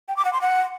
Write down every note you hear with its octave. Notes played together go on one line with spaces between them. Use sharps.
G5
D6
F#5
C6
F#5